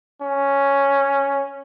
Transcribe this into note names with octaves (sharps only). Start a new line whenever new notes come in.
C#4